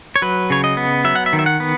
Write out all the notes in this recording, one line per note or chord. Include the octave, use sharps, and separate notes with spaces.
C#5
F#3 B4
C#3 C#5
D#5
B3
F#3 E5
F#5
E5
D#3
E5
F#5
B3